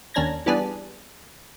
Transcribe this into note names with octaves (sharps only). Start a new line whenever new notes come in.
D#2 C#4 D4 A#5 G#6 A#6
E3 G3 B3 D4 G#4